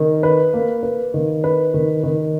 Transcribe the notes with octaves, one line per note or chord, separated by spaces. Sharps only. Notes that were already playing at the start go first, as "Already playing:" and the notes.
Already playing: D#3
B4
A#3
B4
D#3
B4
D#3
D#3